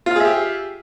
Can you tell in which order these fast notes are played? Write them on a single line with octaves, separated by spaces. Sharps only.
F4 F5 G#4 E5 G4